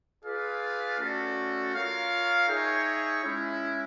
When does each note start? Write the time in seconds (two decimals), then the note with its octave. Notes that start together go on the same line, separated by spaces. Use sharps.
0.25 F4 G#4 B4 D5 F5
0.99 A3 C#4 F#4 A4 D5
1.74 F4 A#4 C#5 F5
2.48 D#4 G#4 C#5 E5 G5
3.23 G#3 C#4 E4